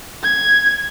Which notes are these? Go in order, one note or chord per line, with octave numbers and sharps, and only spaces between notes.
G#6